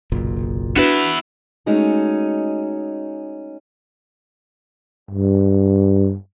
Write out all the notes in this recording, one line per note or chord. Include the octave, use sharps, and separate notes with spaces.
F#1 B1 A#2
B3 D4 E4 F#4 B4
G#3 A3 C#4 D#4 F#4
G2